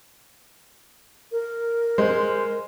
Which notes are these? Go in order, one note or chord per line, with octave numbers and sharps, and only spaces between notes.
A#4
G#3 C5